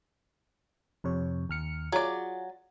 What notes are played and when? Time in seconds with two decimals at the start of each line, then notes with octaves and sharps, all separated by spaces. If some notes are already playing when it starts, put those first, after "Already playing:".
1.04 F2 C3 C#5
1.49 D#2 F6 C#7
1.92 F#3 F4 G#4 D5